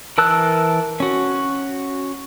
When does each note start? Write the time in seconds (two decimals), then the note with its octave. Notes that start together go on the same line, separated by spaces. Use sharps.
0.18 E3 A#4 A5 E6 F#6
1.00 C#4 F#4